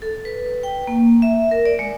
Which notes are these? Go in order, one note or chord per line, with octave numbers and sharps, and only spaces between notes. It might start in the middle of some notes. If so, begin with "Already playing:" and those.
A4
B4
G5
A#3
E5
A#4
D5
G#3